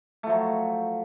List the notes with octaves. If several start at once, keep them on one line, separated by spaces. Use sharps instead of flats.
F3 F#3 A3